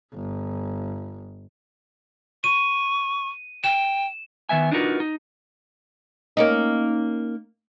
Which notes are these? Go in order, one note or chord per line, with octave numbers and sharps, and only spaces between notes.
G1
C#6 D#7
G5 E7
D#3 B3 E5 G#5
D4 D#4 F4 F#4 A#4 B4
D#4
A#3 C#4 D#4